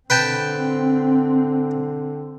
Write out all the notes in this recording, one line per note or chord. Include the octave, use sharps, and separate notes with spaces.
D3 C4 B4 G5 A5